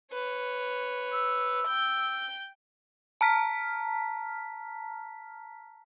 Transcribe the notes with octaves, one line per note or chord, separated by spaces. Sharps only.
B4 C#5
E6
G5 G6
A5 A#5 F6 B6